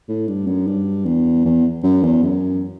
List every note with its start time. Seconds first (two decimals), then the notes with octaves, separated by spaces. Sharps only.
0.09 A2
0.28 G2
0.47 F#2
0.67 G2
1.06 E2
1.45 E2
1.84 F#2
2.03 E2
2.23 F#2